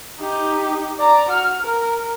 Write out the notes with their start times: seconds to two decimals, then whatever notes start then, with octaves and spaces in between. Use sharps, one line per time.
0.20 D#4 G4
0.98 D5 A#5
1.29 F#4 F6
1.62 A#4